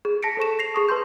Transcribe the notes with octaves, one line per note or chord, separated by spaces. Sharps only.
G#4
A5 A#6 B6 C#7 D7
A4 C5 C#6 E7
A#6 C7 F7
G#4 C#6 D#6
B4 A5 C6 G6